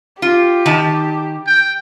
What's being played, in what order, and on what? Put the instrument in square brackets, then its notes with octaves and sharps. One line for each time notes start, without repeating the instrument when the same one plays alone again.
[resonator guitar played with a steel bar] F4 [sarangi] G4
[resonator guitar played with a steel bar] D#3 A5
[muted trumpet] G5